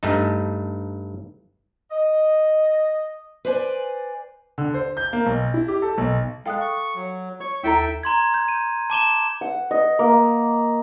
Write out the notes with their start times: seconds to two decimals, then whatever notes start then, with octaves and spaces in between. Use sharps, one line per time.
0.03 G2 A3 D#4
1.91 D#5
3.45 B4 C5 D5 G#5
4.58 D3
4.74 C5
4.97 G6
5.13 A#3
5.26 B1
5.54 E4
5.68 G4
5.82 A4
5.98 B1
6.46 G#3 A4 F5 G5 D#6 F#6
6.61 C#6
6.96 F#3
7.40 C#5 C#6
7.64 D#2 E4 A4 E5 G5 A#5
8.03 A#5 C6 G#6
8.34 G6
8.48 D#7
8.90 A5 D6 E7 G7
9.41 F#5
9.71 D#5
9.99 A#3